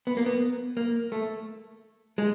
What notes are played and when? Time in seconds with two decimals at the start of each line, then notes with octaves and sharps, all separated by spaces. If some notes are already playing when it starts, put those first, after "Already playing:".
0.07 B3
0.17 A#3
0.26 B3
0.77 A#3
1.12 A3
2.18 G#3